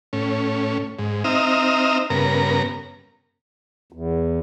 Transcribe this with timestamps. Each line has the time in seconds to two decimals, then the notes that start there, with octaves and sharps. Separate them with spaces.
0.13 A2 C#4
0.99 G#2
1.24 C4 D#4 E5 A#5 D#6 F6
2.10 G2 C#3 B3 A#4 A#5
3.92 E2